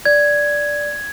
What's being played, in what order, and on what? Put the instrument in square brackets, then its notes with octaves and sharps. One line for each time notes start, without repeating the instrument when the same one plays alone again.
[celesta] D5 [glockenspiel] G#6